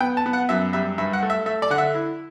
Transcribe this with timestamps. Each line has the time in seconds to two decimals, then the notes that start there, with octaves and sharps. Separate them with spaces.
0.01 B3 G5
0.17 A5
0.26 B3
0.33 F#5
0.49 F#2 E5
0.73 G3 E5
0.98 G2 E5
1.13 F#5
1.23 A3
1.30 E5
1.46 A3 E5
1.62 D5
1.70 D3 F#5
1.78 E5
1.95 E4